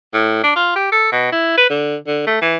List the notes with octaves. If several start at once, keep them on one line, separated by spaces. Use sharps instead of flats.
A2
D4
F4
G4
A4
B2
E4
B4
D3
D3
A3
E3